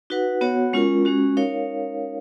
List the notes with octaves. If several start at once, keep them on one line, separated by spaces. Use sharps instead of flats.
D#4 F#4 B4 F#5
B3 F#4 C#5 F#5
G#3 C#4 F4 A#4
G#3 C#4 F#4
D#4 A#4 C#5 F5